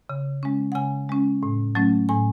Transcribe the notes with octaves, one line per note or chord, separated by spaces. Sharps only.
C#3
G#3 C#4
F#5
C#3 G#5
G#3 C#4
A2
F#3 A3 C#4
A2 G#5